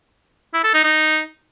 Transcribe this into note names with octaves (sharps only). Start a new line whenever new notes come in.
E4
A4
D#4
D#4